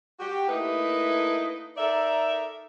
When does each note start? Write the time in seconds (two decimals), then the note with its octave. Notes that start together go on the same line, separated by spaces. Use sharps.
0.19 F#4 G4
0.48 A3 A#3 D#4 E4 B4
1.77 D#4 A4 A#4 D5 E5